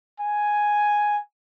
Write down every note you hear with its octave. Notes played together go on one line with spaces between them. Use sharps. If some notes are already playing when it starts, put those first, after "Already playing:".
G#5